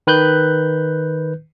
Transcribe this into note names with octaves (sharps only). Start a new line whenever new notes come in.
D#3 B4 F#6 G6